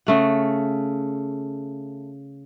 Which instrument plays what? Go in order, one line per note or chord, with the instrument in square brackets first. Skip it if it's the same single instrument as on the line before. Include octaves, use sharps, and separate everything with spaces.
[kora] C#3 A3 F#5